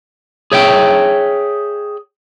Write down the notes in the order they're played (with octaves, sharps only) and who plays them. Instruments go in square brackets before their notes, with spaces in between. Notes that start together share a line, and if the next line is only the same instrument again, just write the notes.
[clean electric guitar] G#4 C#5 E5 G5